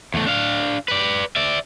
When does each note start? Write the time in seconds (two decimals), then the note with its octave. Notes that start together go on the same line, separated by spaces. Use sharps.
0.14 E2 A3
0.27 D4 F5
0.88 B4 D5
1.36 D5 E5